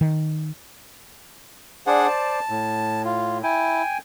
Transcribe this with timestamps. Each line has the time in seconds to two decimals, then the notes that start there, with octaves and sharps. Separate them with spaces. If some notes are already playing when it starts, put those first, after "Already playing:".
0.01 D#3
1.87 D4 G#4 C5 D5 F#5
2.07 A5
2.49 A2
3.05 F4
3.43 E4 G5 G#5